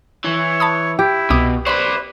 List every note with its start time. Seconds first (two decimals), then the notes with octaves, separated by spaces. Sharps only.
0.25 E3 C#5
0.60 A5 B5 D#6
0.99 E4 G4
1.30 C2 B2 D6 D#6
1.66 B4 C5 D5 B5 C6